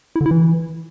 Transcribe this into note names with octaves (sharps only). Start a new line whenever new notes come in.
E4
D3
E4
E3